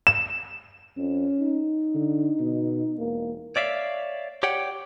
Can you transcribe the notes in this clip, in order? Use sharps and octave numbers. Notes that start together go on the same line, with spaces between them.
E7
F2 C#4
D#4
D3
B2
E1 A#3
C#5 D5 E5 F5
G4 C#5 D5 F#5 G5